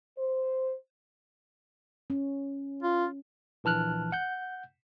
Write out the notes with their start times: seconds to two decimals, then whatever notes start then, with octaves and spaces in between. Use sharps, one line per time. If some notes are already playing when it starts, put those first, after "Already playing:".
0.18 C5
2.10 C#4
2.83 F4
3.64 A#1 E3 A5 F6 F#6
4.12 F#5 G6